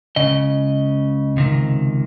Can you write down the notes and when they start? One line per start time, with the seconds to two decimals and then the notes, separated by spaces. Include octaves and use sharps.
0.16 C#2 C#3 D#5
1.37 C#2 C3 D#3